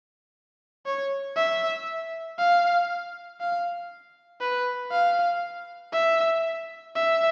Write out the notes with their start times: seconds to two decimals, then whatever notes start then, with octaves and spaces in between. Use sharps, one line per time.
0.86 C#5
1.37 E5
2.38 F5
3.40 F5
4.41 B4
4.92 F5
5.93 E5
6.96 E5